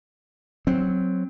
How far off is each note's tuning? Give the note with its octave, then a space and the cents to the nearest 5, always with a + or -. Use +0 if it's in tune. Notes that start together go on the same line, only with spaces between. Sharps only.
F#3 +0 C4 +0